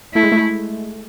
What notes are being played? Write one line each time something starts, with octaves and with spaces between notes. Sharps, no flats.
A3 E4
G#3
A3